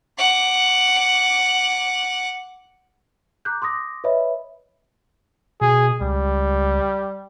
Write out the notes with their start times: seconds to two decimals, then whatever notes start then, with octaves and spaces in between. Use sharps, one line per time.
0.18 F#5 D6
3.45 A#5 D6 F#6 G6
3.62 C6 D6 D#6 A#6
4.04 B4 C#5 D#5 E5 B5
5.61 B2 G#4
6.00 C#2 G3